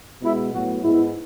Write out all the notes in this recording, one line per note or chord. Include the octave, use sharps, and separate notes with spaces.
B2 G#3 B3 E4
A2 F#3 B3 F#4
G#2 G#3 B3 E4